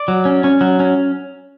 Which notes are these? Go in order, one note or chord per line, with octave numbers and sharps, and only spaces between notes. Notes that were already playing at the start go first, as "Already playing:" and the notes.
Already playing: D5
F#3
C#4
C#4
F#3
C#4